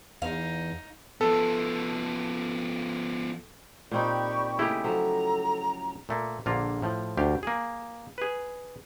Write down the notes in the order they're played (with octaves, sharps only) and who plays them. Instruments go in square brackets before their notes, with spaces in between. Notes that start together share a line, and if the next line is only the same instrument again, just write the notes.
[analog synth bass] E2 [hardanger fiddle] D#4 [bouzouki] F5
[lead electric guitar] F3 B3 [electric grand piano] A4
[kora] A#2 C4 D#4 [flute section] G4 B5 C#6 [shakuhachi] D5
[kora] C#3 A3 D#5 [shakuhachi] A#3 [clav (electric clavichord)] E4 G4
[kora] F3 F#3 [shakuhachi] A4 [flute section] A#5
[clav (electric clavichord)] A#2 A3 A#3
A#1 D3 A#3 F4
A2 F3
D2 G4 F5
A#3 G#4
G#4 B4